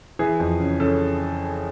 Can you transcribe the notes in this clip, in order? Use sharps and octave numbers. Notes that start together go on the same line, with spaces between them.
E3 G#4
F2
C#3
C#3 A4